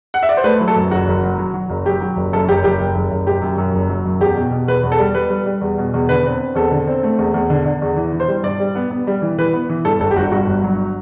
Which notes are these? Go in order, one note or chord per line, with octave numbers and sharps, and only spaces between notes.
F#5
E5
D5
C5
A3 B4
F#3
A4
F#2
F#1 F#4
F#1
F#3
F#3
F#3
F#1
F#3 G4
F#3
F#1
F#2 A4
F#1 G4
F#1 G4
F#1
F#1
F#1
F#2 G4
F#2
F#2
F#1
F#3
F#2
E2 G4
B2
B2
E2 B4
E2
A4
G3
G3 B4
G3
G3
E2
B2
E2
D3 B4
C4
C4
E2 A4
D3
C4
A3
E2
E2
D3
D3
E2
E3
E3
C5
G3
G2 D5
G3
B3
B3
G3
E3
E3 B4
B3
E3
G2 A4
G1 A4
G4
G1 F#4
G2 F#4
G1
F#3